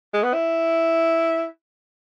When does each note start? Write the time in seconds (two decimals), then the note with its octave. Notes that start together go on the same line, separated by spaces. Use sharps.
0.13 G#3
0.23 B3
0.33 E4